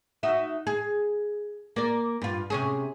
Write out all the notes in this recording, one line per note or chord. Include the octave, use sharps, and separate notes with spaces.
D#4 F#4 E5
G#4
A#3 D5
G2 F4
C3 C#4 G#4